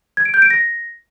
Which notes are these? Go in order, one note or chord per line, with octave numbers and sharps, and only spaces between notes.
G#6
D7
G6
D7
A#6